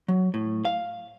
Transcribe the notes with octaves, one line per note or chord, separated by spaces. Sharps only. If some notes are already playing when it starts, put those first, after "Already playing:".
F#3
A2
F5